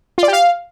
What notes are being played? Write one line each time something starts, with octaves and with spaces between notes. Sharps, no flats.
F4
D5
G4
F5